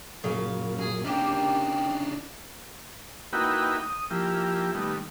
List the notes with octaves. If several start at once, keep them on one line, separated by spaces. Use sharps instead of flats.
F#2 A#2 C#3 F5
G#4
C#3 A#3 D4 D#4 G4
A#3 D#4 E4 F#4 B4 G5
D#6
F3 A#3 E4 G4
D#3 G3 A3 B3